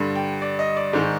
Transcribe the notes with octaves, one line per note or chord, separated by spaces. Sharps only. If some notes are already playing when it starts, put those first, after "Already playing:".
Already playing: G2 D3 G3
G5
D5
D#5
D5
G#2 D#3 G#3